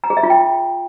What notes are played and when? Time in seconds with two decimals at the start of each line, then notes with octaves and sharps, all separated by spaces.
0.04 A#5
0.10 G#4
0.17 E5
0.23 F4
0.30 G5